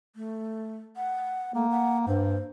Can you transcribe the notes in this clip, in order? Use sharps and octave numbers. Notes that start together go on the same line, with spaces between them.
A3
F#5
A3 A#3
F#5
G2 C5